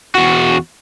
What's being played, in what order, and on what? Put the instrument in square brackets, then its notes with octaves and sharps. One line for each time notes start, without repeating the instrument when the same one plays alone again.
[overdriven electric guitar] E2 F#4